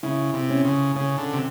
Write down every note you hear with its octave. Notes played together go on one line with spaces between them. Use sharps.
C#3 E4
C3
C#4
C#3
C#3 C#4
D3
C3